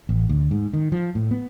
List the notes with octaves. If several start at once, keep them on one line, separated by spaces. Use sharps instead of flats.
A1
D2
G#2
D#3
F3
A2
B3